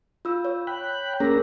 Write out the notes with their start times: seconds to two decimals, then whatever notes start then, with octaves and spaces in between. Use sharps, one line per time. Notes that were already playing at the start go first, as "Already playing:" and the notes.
0.25 F4 E6
0.45 C#5
0.67 G5 B5 F#6
1.20 A#3 C#4 G#4 A#4 A#5